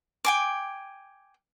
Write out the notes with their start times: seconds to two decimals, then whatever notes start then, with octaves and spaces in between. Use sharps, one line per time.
0.25 G5 G#5 D6